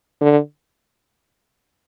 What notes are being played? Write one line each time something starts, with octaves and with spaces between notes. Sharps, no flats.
D3